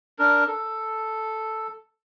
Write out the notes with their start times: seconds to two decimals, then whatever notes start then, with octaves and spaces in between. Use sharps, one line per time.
0.19 D4 A#4
0.48 A4